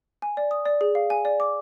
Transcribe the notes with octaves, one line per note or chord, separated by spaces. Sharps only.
G#5
D5
D#6
D5
G#4
F5
G#5
D5
D6